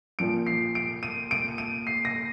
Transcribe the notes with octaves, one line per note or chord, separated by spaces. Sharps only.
A#2 F3 D7
C7
D7
D#7
D7
D#7
C7
A#6